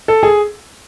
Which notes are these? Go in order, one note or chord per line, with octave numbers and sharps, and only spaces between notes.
A4
G#4